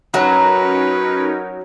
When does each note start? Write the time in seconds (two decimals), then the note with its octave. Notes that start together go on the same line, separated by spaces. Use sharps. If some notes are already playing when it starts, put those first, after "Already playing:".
0.14 F#3 C#4 D#4 A#4 B4 A#5